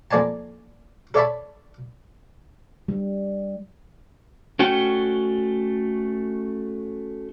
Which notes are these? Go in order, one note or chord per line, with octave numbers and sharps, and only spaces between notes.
F2 A#3 D5 G#5 A5
A4 C#5 D5 E5 A5 B5
G3
A3 C#4 F#4 G5